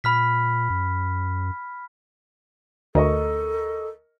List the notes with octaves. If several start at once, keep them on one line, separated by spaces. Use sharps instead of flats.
A#2 B5 F6 B6
F#2
D2 A4 A#4 D#5 C#6